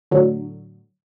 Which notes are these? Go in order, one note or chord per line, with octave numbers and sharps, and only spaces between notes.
A2 D3 F#3